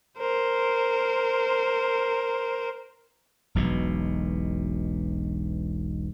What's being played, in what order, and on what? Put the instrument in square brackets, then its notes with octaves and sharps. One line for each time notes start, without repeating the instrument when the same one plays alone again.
[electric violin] A#4 C5
[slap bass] E1 B1 B2